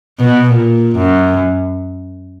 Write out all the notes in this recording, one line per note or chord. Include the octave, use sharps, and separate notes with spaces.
B2
A#2
F#2